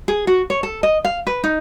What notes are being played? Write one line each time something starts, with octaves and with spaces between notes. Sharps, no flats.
G#4
F#4
C#5
A4
D#5
F5
B4
D#4